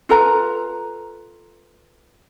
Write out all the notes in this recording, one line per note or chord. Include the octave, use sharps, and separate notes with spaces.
F4 A4 B4 A#5